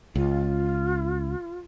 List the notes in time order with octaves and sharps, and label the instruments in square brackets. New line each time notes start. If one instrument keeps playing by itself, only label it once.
[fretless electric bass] C#2 [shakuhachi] F4